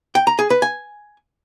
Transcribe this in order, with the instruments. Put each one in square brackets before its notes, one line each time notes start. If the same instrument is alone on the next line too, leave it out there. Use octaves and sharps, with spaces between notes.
[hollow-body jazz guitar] G5
A#5
G#4
B4
G#5